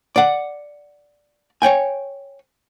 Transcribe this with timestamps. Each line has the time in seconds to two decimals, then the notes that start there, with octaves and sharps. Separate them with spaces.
0.16 D5 F#5
1.62 C#5 D5 G5 G#5